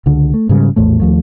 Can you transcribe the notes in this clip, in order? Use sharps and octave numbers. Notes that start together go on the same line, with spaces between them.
C#2 D3
A3
G#2 C#3 G3
A#1 E2 A2 A3
D#2 F3 A3